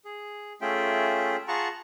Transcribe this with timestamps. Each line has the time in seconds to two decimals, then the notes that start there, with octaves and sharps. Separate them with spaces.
0.05 G#4
0.61 A3 C#4 F4 G#4 E5 G5
1.48 F4 G#4 F#5 A5 A#5 C#6